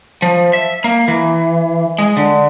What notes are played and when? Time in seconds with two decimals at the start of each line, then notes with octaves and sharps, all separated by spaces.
0.22 F3
0.53 E5
0.84 A#3
1.08 E3
1.99 G#3
2.17 D3